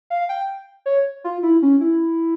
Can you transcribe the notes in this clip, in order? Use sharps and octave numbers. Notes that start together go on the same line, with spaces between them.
F5
G5
C#5
F4
E4
C#4
E4